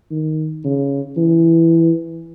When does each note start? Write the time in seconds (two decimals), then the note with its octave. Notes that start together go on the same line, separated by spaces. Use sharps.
0.11 D#3
0.64 C#3
1.17 E3